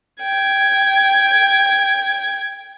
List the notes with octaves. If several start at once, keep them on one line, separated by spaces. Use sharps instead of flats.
G5 G#6